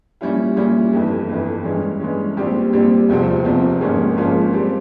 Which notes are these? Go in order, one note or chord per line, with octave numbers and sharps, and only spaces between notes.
A#2 G3 C#4 E4
A#2 G3 C#4 E4
G1 F2 E3
G1 F2 E3
G2 E3 G#3 C#4
G2 E3 G#3 C#4
A#1 A#2 G3 C4 G4
A#1 A#2 G3 C4 G4
F1 E2 C3 F3 C4
F1 E2 C3 F3 C4
G#1 G#2 F3 A#3 C#4
G#1 G#2 F3 A#3 C#4
G3 C4 G4